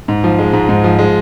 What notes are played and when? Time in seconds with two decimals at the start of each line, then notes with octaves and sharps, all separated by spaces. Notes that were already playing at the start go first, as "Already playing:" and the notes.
0.08 G#2
0.24 F3
0.39 G#3
0.53 G#2
0.69 G#2
0.84 F3
0.99 G#3